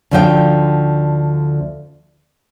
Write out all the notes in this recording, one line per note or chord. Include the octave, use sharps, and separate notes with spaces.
D2 D3 F3 D#4 D#5 G5